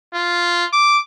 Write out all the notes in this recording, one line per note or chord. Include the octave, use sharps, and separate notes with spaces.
F4
D6